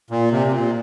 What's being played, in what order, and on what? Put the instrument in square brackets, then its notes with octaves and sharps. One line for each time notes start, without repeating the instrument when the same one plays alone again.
[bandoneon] A#2
C3
C3
A#2